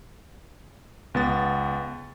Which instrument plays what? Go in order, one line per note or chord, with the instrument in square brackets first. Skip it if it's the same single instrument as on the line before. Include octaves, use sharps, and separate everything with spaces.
[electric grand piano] C#2 B3 A6